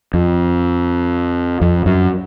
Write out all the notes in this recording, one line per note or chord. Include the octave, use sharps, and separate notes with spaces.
F2
F2
F#2